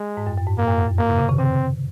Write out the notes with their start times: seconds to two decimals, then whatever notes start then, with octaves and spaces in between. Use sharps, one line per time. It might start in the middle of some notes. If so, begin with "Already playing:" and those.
Already playing: G#3
0.17 G#2
0.27 F#2
0.38 F#2
0.47 G#2
0.57 A#2 A#3
0.68 F#2
0.78 F2
0.88 F#2
0.98 G#2 A#3
1.08 C3
1.18 C#3
1.29 C3 D#3
1.38 C#3 C4